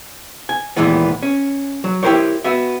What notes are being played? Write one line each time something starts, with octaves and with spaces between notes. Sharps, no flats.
G#5
D#2 A#2 E3 G#3 B3
C#4
F#3
E4 G4 G#4 A#4 C5 C#5
B3 F#4 E5